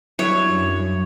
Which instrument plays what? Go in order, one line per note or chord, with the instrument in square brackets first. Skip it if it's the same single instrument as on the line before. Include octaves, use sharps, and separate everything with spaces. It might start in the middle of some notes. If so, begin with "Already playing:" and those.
[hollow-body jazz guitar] G2 F#3 E4 [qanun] C#5
[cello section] F#2